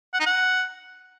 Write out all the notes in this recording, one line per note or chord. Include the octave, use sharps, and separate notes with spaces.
F#5
D#4
F#5